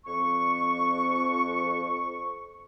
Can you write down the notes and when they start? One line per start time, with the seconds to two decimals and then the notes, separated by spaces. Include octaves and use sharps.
0.06 F2 C#6